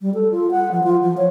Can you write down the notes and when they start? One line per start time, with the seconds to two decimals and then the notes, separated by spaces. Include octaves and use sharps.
0.01 G3
0.14 A4
0.31 F4
0.51 F#5
0.72 F3
0.84 F4
1.03 F3
1.17 C#5